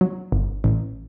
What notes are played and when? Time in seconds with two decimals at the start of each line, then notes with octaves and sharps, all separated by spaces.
0.01 F#3
0.32 G1
0.64 A1